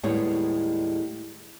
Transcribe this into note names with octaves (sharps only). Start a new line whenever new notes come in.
D#2 A2 G3 G#3 B3 C#5